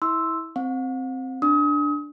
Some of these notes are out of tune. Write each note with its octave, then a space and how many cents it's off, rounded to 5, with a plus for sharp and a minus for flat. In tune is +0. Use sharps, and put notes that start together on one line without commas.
E4 -20 C6 +0 E6 +0
C4 +0 F#5 -45
D4 +0 D#6 +35